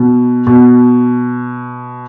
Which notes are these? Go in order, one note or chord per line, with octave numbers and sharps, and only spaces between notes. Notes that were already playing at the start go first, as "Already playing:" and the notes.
Already playing: B2
B2